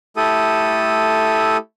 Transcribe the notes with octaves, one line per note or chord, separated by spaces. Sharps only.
A3 E4 G4 A4 D#6